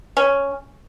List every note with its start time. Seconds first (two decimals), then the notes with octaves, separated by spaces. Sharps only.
0.17 C#4